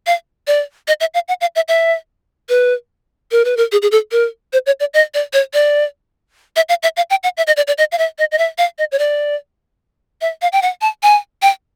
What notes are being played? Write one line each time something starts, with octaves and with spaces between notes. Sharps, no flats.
F5
D5
D#5
E5
F5
F#5
F5
E5
E5
B4
A#4
B4
A#4
G#4
G#4
A4
A#4
C5
C#5
D5
D#5
D5
C#5
D5
E5
F5
E5
F5
G5
F#5
E5
D#5
D5
D5
D#5
F5
E5
D#5
D#5
E5
F5
D#5
C#5
D5
E5
F5
G5
F#5
A5
G#5
G5